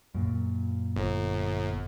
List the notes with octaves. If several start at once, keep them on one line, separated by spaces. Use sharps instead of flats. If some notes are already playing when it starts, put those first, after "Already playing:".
F#2 A#2
G1